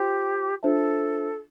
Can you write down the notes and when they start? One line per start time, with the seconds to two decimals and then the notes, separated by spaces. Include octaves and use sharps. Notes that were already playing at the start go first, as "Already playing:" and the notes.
Already playing: F4 G4 C5 G5 C6
0.63 D4 F4 A4 C5 E5 A5